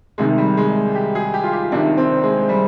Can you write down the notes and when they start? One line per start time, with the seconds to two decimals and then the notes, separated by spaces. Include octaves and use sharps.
0.18 C2 C3 D#3 G#3
0.38 G3
0.57 G#3
0.95 G4
1.15 G#4
1.34 G4
1.43 F4
1.53 G4
1.72 C2 C3 D#3 D4
1.97 C4
2.23 G#3
2.49 G3